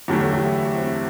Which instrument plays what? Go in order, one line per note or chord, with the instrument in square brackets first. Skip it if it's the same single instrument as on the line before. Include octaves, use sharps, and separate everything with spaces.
[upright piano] E2 D3 F#3 A3 [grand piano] G4
[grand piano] A4
E4 G4
F#4
C4 E4